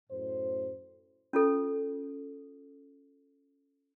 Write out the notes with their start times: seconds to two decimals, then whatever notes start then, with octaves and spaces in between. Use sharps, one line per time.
0.10 F#2 A2 C5
1.33 C#4 F4 A4